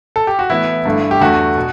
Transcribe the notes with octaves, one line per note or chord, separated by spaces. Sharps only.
A4
G4
F#4
A2 E3 B3 E4
G2 D3 A3
G4
E2 D3 A3 F#4
B2